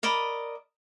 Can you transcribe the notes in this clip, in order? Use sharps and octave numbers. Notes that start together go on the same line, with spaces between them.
A#4 D5 D#5 B5